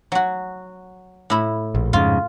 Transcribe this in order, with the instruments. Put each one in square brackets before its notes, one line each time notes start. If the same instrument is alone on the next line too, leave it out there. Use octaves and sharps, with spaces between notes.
[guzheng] F#3 F#4
A2 E4
[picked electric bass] A#1
[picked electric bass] F2 G#2 C#3 [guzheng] F4